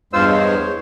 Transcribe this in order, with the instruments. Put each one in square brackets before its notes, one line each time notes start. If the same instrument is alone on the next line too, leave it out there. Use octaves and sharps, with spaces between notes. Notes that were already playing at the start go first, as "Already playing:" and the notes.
[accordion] E2 G2 G#3 [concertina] F4 C5 E6
[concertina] C5 C#5